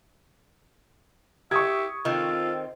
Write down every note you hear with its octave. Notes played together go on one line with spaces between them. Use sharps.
G4 E5 C#6 D#6 G#6
D#3 C4 F4 A4